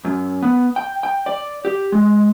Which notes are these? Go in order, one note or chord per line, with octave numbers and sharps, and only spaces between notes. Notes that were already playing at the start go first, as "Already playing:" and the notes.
F#2
B3
G5
G5
D5
G4
G#3